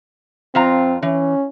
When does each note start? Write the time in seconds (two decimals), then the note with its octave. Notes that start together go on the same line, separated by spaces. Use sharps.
0.55 F2 C4 F4 A#5
1.02 E3 C#4